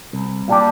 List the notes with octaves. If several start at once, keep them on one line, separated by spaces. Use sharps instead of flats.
C2
A#2 G3 D4 G4